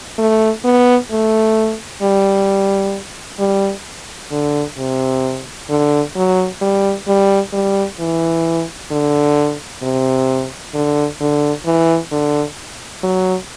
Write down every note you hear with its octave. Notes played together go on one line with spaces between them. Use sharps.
A3
B3
A3
G3
G3
D3
C3
D3
F#3
G3
G3
G3
E3
D3
C3
D3
D3
E3
D3
F#3